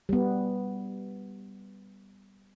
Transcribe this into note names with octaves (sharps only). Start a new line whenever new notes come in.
G3 B3